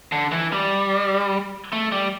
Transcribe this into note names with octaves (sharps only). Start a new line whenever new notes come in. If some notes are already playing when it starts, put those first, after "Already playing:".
D3
E3
G3
A3
G3